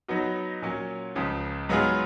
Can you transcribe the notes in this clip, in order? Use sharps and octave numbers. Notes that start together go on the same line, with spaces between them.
F#3 B3 D#4 F#4
A#2 F#3 C#4
C#2 C#3 F3
G#2 F#3 B3 F4 G#4